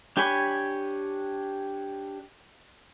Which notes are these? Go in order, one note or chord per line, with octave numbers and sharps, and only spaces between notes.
D4 G4 C#5 G#5 B5